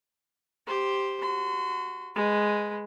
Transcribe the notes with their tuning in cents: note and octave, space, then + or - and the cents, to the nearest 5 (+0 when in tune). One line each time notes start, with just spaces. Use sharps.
G4 +0 C5 +0
F#4 -10 C6 -40
G#3 +0 B4 +10